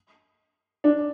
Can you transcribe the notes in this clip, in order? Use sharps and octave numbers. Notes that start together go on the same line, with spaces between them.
D4